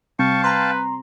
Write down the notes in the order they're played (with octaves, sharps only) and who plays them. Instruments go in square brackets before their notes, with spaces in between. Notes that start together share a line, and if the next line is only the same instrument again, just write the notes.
[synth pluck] C3 G3 C4 [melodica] F5 G5 A5 [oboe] C#6
[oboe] B4 [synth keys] A#5 C6